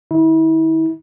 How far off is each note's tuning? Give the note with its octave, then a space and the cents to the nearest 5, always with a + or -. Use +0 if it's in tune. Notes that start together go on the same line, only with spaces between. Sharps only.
D#3 -25 E4 -35